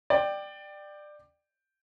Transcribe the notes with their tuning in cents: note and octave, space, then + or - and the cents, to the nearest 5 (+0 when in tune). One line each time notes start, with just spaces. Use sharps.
D5 +20 G5 +0